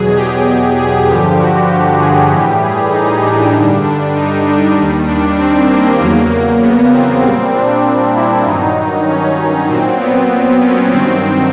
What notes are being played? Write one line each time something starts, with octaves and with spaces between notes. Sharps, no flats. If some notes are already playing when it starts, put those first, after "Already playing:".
Already playing: E2 B2 F#3 G#4
G4
G#4
G2 D3 F3 G4
F#4
G4
G#4
A2 E3 G3 G4
G#4
D#4
D4
G2 D3 G3
D4
D#4
D4
D#2 D#3 G3
D4
C4
A#3
E2 C#3 F#3 A#3
A#3
B3
C4
A#2 G3 C4
D4
E4
G2 D#3 F#3 D#4
C#4
A#2 F#3 C4
B3
C#4
G2 D#3 F#3 C4